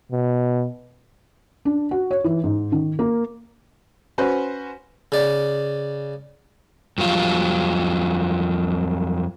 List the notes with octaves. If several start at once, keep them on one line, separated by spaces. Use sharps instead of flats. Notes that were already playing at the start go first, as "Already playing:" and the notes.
B2
D4
F#4
C#5
E3
G#2
D#3
A#3
C#4 F#4 B4 C5
C#3 D5
F2 F#3 G3 F4